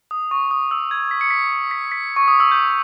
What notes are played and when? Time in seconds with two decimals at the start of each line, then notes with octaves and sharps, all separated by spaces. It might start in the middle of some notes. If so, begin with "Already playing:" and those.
0.11 D#6
0.31 C#6
0.51 D#6
0.71 E6
0.91 G#6
1.11 B6
1.21 C#7
1.30 B6
1.71 B6
1.92 B6
2.16 C#6
2.28 D#6
2.40 E6
2.51 G6